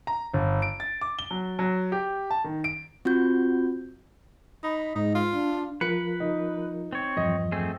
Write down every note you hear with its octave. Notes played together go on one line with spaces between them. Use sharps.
A#5
G1
D7
A6
D6
G7
F#3
F#3
G4
A5
D#3
D7
C4 F4 F#4 G6
D#4 B5
G#2 D#4
F4
D4
F3 F4 A#4 B4 C#7
D#4
C4 C#5
E2 G2 F3 D#5
A3 C4 G#4